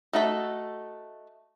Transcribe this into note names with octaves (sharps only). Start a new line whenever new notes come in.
A3 D#4 F#4 A4 E5